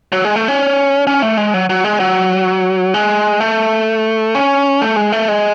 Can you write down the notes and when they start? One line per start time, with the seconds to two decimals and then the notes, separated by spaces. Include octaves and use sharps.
0.12 F#3
0.25 G#3
0.36 A3
0.48 C#4
1.07 C#4
1.22 A3
1.37 G#3
1.54 F#3
1.70 F#3
1.84 G#3
2.00 F#3
2.94 G#3
3.40 A3
4.35 C#4
4.81 A3
4.96 G#3
5.12 A3
5.29 G#3